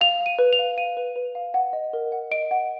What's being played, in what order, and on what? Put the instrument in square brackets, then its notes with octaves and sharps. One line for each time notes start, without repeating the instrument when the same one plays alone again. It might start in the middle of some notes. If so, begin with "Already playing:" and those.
[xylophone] F5 F7
F5
D#7
B4
F7
F5
F5 D#7
B4
B4
F5
F#5
D#5
A#4
F#5
D#5 D7
F#5